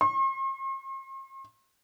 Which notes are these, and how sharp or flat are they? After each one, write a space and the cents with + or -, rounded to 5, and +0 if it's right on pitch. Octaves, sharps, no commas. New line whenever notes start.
C6 +45